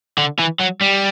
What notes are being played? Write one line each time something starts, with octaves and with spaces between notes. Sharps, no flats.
D3
E3
F#3
G3